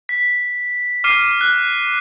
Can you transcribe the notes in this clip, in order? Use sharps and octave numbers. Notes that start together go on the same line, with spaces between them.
B6
D6 F6 C7 D#7
F#6